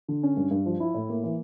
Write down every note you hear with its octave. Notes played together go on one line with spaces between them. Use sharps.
D3
C#4
G2
G2
F3
E4
A2
A#3
E3